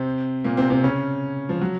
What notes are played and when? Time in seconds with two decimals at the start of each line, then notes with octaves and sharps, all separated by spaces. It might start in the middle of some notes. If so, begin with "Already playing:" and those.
Already playing: C3 C4
0.44 A#2 A#3
0.57 C3 C4
0.70 C3 C4
0.83 C#3 C#4
1.49 F3
1.61 F#3